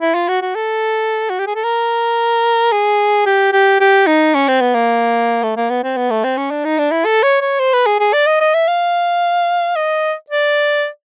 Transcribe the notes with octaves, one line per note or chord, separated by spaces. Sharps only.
E4
F4
F#4
F#4
A4
F#4
G4
G#4
A4
A#4
G#4
G4
G4
G4
D#4
C#4
C4
B3
A#3
A3
A#3
B3
C4
B3
A3
C4
C#4
D4
D#4
D4
E4
A4
C#5
C#5
C5
B4
G#4
G#4
D5
D#5
D#5
E5
F5
D#5
D5